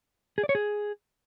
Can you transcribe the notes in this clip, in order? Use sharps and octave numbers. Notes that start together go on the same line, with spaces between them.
G#4
D5
C#5
G#4